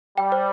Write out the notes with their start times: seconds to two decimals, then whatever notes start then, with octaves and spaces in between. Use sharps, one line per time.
0.18 G3 G5
0.32 C5